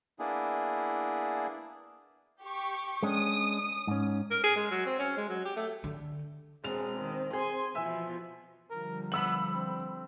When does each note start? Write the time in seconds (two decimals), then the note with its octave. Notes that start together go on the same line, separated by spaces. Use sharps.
0.19 A#3 B3 D4 E4 G#4
2.43 G4 C#6
3.03 G#3 C#4 D4 D#6
3.87 G#2 C#4
4.31 A#4
4.44 G#4
4.57 G#3
4.71 F#3
4.86 C4
4.99 C#4
5.17 G#3
5.29 F#3
5.45 G4
5.56 A3
5.84 D3
6.64 E1 G#3 C4 F7
6.98 D#3
7.33 G#4 G#5 C6
7.75 B2 E3 F3 E5 G#5 E6
8.71 D3 F3 G3 A#4
9.12 B3 B5 E6 F#7
9.53 C4